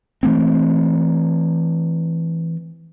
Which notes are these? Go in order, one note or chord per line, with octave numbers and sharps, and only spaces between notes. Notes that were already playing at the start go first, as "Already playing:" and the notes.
E3 A3 C4